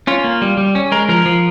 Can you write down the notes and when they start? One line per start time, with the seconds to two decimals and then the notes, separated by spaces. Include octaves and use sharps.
0.07 C#4 F4
0.24 A#3
0.42 G3
0.57 G3
0.75 C#4
0.92 G#3 A#4
1.09 F3 A#4
1.26 F3